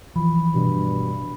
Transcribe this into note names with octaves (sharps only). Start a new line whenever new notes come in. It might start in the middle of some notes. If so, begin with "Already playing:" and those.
E3 F3 B5
G2 B2